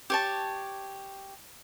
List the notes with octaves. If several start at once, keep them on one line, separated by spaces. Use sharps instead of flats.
G4 C#5 A5